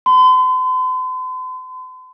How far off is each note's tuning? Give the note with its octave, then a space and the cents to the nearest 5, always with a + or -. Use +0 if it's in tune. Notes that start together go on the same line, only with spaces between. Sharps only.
C6 -45